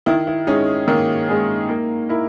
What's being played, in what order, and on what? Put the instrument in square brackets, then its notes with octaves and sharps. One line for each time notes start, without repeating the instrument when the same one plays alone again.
[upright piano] D#3 [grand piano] E4
[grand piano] E4
[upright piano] G#3 C#4 G#4 [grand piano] D#4
[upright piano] D#3 [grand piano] A#3
[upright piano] G#3 C#4 G#4
A#3
E4 A#4